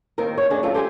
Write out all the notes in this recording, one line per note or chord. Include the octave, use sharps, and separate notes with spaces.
D#2 D#3 C4 A#4
C#5
D2 D4 G#4 D#5
F#2 C4 F4 A4 A5
G4 A4 C5 E5 G#5